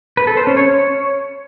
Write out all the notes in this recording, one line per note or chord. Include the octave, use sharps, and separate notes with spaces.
B4
A4
C5
C#4
C#5